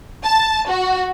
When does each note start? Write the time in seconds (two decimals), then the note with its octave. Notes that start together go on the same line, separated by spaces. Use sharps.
0.24 A5
0.69 F#4